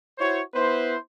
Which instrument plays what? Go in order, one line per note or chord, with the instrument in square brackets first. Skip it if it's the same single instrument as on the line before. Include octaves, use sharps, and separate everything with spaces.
[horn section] E4 F#4 C5 C#5
B3 E4 B4 C5